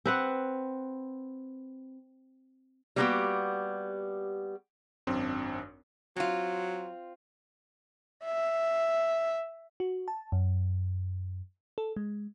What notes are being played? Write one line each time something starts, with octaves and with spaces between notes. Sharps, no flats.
C4 B4 F#5
G3 A#3 B3 D4 F#4 G4
G#1 F#2 C4 D4
F#3 C4 F4
E5
F#4
A5
F#2
A4
G#3